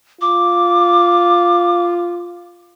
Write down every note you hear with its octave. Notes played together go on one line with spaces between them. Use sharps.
F4 D6